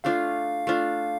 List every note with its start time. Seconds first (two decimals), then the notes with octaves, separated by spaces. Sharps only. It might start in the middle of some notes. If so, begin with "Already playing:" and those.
0.04 A3 D4 F4 F5
0.67 A3 D4 F4